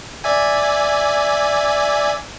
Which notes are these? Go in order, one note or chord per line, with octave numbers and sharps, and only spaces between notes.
D5 E5 G#5